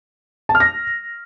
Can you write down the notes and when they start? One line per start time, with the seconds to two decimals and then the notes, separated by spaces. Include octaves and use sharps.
0.49 A5
0.55 F6
0.60 A#6